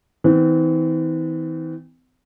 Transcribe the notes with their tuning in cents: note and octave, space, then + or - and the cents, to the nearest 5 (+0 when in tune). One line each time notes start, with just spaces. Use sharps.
E3 -40 C4 -45